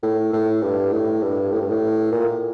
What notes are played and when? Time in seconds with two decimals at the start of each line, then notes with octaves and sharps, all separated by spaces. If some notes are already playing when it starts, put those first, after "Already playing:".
0.03 A2
0.33 A2
0.62 G2
0.92 A2
1.22 G2
1.52 A2
1.61 G2
1.69 A2
2.12 A#2